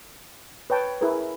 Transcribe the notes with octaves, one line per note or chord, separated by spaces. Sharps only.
B4 C#5 G5 A5
E4 G#4 A#4 B4